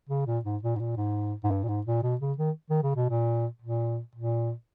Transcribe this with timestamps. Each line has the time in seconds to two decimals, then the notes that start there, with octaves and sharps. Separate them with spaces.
0.09 C#3
0.27 A#2
0.45 G#2
0.63 A#2
0.76 G#2
0.80 A#2
0.97 G#2
1.44 G#2
1.51 G2
1.64 A#2
1.69 G#2
1.86 A#2
2.03 B2
2.21 C#3
2.38 D#3
2.70 D#3
2.83 C#3
2.96 B2
3.10 A#2
3.62 A#2
4.15 A#2